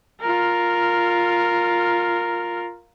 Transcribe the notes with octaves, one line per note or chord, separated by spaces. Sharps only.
F4 A#4